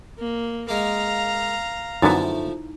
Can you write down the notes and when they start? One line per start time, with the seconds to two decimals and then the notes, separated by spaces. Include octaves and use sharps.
0.19 A#3
0.68 G#3 A#3 F5 A#5
2.02 F#2 D3 F3 A3 B3 D#4 E4